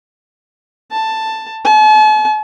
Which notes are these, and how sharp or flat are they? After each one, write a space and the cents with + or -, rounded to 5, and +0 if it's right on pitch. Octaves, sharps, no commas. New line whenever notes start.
A5 +10
A5 -45